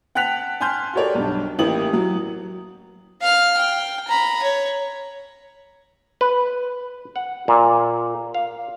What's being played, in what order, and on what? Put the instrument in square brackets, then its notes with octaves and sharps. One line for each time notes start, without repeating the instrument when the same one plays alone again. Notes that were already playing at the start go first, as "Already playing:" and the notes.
[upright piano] F#5 G5 A5 F#6 B6 F7
G#5 A5 C6 F6 G6
F#4 G4 A4 A#4 C#5 D5
B1 G2
A1 A#3 E4 G4 D#6 F#7
F#3
[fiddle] F5 F6
G5
A#5 B5
C#5
[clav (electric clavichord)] B4
F#5
A#2
F5